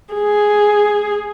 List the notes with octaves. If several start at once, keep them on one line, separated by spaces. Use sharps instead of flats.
G#4